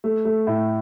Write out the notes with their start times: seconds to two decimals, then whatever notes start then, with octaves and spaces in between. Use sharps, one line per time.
0.04 A3
0.25 A3
0.47 A2